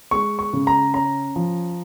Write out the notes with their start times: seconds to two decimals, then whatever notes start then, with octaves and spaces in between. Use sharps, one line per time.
0.11 G#3 C#6
0.39 C#6
0.53 C#3
0.67 A#5
0.94 C#4 A#5
1.36 F3